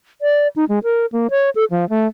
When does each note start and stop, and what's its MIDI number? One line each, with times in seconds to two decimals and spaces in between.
0.21 0.48 74
0.56 0.65 63
0.69 0.79 56
0.84 1.06 70
1.12 1.27 58
1.30 1.50 73
1.55 1.65 69
1.71 1.88 53
1.89 2.07 57